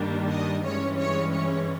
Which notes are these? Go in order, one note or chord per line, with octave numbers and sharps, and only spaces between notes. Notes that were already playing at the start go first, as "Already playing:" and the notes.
Already playing: G2 D#3 G3 A#3 D4
D#5
G2 E3 G#3 C#4 C#5
C#5
C#5